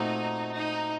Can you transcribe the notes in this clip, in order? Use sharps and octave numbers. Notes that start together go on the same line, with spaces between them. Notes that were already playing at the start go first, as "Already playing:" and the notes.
Already playing: A#2 A3 C4 D#4 F#4
D#4